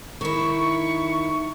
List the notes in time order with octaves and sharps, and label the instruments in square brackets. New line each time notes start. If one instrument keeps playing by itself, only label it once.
[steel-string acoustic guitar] D#3 E4 [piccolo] C#6